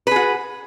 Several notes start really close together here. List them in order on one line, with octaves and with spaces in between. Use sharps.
B4 G#4 F#4